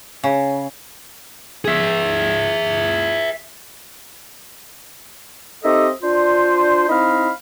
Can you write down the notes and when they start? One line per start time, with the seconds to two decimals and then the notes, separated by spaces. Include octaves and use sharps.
0.24 C#3
1.65 G#4 E5
5.64 C4 D#4 G4 A4 D#5 E5
6.03 D4 F4 C5
6.89 C4 D#4 E4 D#5 F5 B5